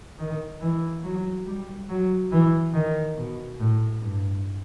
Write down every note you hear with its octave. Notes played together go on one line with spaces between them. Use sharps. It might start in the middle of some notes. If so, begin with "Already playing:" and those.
D#3
E3
F#3
G3
F#3
E3
D#3
B2
A2
G2